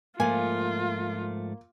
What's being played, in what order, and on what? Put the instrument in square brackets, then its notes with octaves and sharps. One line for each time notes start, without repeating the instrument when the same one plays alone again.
[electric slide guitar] G#2 F3 A3 [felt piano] A#3 [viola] F4 [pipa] G#5